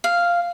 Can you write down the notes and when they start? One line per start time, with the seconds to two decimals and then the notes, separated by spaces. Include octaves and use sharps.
0.04 F5